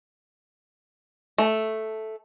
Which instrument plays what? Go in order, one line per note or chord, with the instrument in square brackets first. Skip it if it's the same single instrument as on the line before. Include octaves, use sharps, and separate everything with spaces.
[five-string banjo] A3